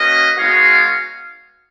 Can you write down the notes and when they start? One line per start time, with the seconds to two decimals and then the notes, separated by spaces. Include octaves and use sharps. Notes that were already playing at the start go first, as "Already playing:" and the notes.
Already playing: A#3 C#4 F#4 B4 D#5
0.38 G#3 B3 D#4 F#4 C#5 F5